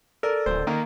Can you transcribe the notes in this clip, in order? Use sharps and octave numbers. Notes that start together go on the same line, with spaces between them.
A4 A#4 D5
D1 C5
D#3 A#3